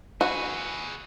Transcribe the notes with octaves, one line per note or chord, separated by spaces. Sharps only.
F#4 G#4 B4